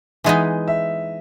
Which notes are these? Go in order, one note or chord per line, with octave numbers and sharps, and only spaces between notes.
E3 G#3 B3 D#4 G#4 D#5
E5